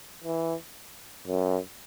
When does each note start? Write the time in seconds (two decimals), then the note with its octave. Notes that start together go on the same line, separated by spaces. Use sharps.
0.24 E3
1.27 F#2